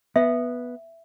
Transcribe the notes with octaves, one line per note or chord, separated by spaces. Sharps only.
B3 E5